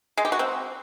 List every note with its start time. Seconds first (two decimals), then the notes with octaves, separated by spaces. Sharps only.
0.17 G#3
0.25 G4
0.32 F#4
0.39 C4